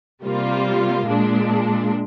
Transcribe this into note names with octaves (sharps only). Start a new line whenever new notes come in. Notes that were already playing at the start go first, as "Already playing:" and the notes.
C3 G3 A#3 F4
A#2 G#3 D4